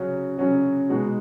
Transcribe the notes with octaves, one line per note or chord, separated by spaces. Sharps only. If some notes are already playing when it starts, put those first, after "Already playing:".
Already playing: C#3 F#3 C#4 F#4
C#3 F#3 C#4 F#4
B2 G#3 D#4 F#4